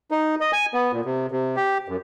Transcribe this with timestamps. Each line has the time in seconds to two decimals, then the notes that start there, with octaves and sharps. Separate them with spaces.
0.11 D#4
0.41 D#5
0.53 G#5
0.74 B3
0.93 A#2
1.05 C3
1.32 C3
1.56 G4
1.88 F#2